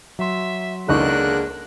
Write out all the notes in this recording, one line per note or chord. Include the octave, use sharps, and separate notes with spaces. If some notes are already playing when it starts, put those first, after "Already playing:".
F#3 E5 C6
C#2 D3 G#3 A#3 D#4 C#6 F#6